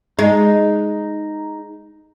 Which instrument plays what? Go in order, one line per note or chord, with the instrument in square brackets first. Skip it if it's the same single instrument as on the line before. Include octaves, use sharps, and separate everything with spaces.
[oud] G#3 [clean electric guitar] D#4